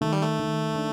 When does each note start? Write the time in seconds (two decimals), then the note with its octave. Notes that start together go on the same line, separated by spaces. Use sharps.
0.01 D#3 A3
0.12 G3
0.22 A3
0.39 D#3
0.75 D4